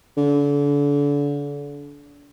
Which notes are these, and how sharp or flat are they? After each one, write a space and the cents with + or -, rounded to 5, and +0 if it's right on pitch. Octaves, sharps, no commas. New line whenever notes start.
D3 -35